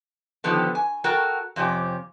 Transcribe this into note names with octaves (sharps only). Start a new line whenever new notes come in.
D3 D#3 F3 B3 G4 A4
G#5
F#4 A4 A#4 G5
F2 C3 C#4 G4